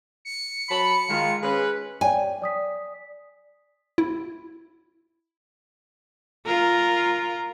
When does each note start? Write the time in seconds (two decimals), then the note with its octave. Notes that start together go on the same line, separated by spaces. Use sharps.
0.25 C#7
0.69 F#3 A5 B5
1.08 D#3 G#3 F4
1.42 G#3 C#4 B4
2.01 C#5 D5 G5 G#5
2.42 D5 D#6 B6
3.98 E4
6.46 F4 A#4